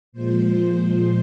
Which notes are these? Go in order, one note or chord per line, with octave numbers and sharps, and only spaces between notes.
A#2 F3 G#3 C5